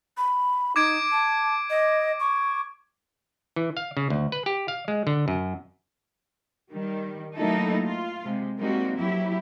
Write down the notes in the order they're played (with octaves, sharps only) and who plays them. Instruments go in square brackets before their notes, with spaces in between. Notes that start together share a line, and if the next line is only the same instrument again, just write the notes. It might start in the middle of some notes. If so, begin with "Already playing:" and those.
[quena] B5
[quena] D#4 [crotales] D6 G#6 D7
[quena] A5
D#5
C#6
[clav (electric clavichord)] E3
F5
C#3
D2
B4
G4
F5
G#3
D3
F#2
[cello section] D#3 G3
F#3 A3 A#3 D#4 E4 A4
F4
C3 G#3
G3 G#3 A#3 C4 D#4 F#4
F2 F#3 E4 G4